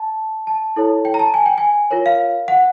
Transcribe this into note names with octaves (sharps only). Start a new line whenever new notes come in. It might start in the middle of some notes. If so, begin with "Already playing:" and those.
Already playing: A5
A5
E4 A4 C#5
G5
A#5
A5
G#5
G5
G#5
F4 A#4 C#5
F5
F#5